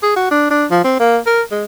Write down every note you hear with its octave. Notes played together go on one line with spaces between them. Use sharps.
G#4
F#4
D4
D4
F3
C4
A#3
A#4
G#3